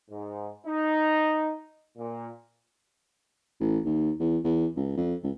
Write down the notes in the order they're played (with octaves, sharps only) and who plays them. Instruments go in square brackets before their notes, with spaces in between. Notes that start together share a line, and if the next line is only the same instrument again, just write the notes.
[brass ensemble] G#2
D#4
A#2
[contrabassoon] A1
D#2
E2
E2
C#2
F2
C#2